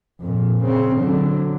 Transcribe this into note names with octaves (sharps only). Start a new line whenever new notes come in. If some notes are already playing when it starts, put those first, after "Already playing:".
F2 A#2
C#3 C4
D3 F#3